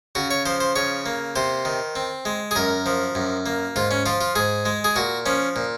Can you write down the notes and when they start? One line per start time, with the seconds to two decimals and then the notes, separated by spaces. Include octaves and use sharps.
0.15 C#3 F#4
0.31 C#5
0.46 F3 C5
0.60 C5
0.76 C#3 C#5
1.06 A#3
1.36 C3 C5
1.65 D#3
1.95 C4
2.25 G#3
2.51 G#4
2.56 F#2 A#4
2.86 F3
3.15 F#2
3.46 A#3
3.76 G#2 F4
3.91 C#4
4.06 F3 F4
4.21 F4
4.35 G#2 G#4
4.65 G#3
4.84 G#4
4.96 A#2 F#4
5.26 F3 C#4
5.56 A#2